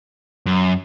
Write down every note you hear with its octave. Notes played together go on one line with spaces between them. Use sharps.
F#2